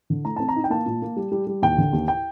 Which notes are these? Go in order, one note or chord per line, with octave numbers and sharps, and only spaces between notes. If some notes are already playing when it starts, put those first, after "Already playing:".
D3
A3 A#5
C4 A5
A#5
D#4
G5
A#3 A5
A#2
A#3
G3
G3
G3
D#2 G5
D3
D#2
G5